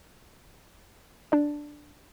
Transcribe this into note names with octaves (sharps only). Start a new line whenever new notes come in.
D4 D5